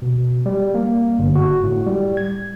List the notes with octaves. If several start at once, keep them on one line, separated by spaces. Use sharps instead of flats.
B2
G3
A#3
G1
F#4
A2
G3
G#6